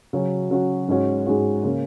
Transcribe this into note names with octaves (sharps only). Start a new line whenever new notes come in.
C#3 F#3 C#4 F#4
C#3 F#3 C#4 F#4
G#2 G#3 C#4 F#4
G#2 G#3 C#4 F#4
C#3 A#3 C#4